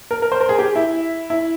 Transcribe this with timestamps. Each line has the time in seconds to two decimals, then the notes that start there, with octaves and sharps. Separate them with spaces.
0.11 A#4
0.22 A#4
0.32 C5
0.41 A#4
0.49 G#4
0.59 G4
0.76 E4
1.30 E4